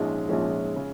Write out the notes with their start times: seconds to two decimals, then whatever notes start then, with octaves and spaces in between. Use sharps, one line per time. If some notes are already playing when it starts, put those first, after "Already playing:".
Already playing: A#1 G#2 F3 G#3 C#4
0.29 A#1 G#2 F3 G#3 C#4
0.76 C#3